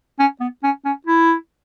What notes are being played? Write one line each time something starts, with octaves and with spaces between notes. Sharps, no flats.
C#4
B3
C#4
C#4
E4